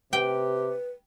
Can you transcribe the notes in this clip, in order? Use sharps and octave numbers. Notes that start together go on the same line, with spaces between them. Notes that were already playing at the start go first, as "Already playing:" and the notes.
C3 G4 B4 G5